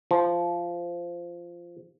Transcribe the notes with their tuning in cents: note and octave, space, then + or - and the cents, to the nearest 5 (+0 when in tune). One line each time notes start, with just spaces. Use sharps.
F3 -10